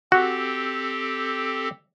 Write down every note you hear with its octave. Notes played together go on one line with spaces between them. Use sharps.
C4 F#4 G4 A4